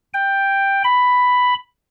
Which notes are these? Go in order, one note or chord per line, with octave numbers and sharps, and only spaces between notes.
G5
B5